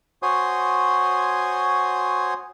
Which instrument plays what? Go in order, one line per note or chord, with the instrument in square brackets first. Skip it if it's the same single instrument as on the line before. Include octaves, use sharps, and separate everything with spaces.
[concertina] F#4 C5 C#5 G#5 C6 D#6